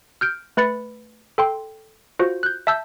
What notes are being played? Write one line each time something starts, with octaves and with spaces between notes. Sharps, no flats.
F6 G6 D7
A3 B4 B5 A6 C#7
A4 G5 C6
F4 F#4 C5
F#6 G6
E5 A5 E6 G6